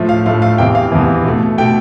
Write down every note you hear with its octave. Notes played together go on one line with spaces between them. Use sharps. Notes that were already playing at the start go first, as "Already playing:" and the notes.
Already playing: A2 F3 A3
F5
A2 F3 A3 F5
F5
E2 C3 E3 G5
F5
E2 C3 E3
B2 A3
B2 A3 G5